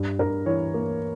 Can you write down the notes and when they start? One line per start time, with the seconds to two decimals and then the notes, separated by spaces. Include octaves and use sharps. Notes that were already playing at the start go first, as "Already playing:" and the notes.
Already playing: G2
0.19 G2 A#4
0.46 E3 C#5
0.74 A#3